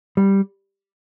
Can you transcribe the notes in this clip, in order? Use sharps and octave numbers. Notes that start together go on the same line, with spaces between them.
G3